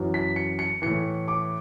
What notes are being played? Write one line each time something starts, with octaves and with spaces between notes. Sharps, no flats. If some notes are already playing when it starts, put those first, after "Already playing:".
Already playing: F#2 E3
B6
C#7
C#7
A2 E3 C#7
D6